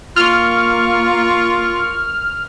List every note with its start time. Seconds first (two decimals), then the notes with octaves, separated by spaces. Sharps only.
0.16 A#3 F4 A#4 C#6 F6